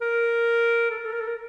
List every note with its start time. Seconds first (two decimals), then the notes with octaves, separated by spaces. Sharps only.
0.01 A#4
0.90 A4
0.98 A#4
1.05 A4
1.12 A#4
1.21 A4
1.27 A#4